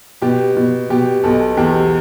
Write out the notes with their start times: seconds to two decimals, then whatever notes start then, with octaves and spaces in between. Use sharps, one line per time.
0.22 B2 G4
0.56 B2
0.90 B2 G4
1.23 B1 A4
1.57 E2 G4